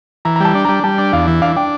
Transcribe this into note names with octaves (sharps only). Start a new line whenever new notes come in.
E3 A#5
A#5
G3 A5
D4
A#5
G3
G3 A5
D4
E2 F5
E3
D4 F5
D4 G5